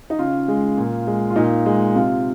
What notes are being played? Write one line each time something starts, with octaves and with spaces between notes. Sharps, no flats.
D#4
C#3 F4
G#3
A#2
G#3
F4
A#2 D#4
G#3
C3 F4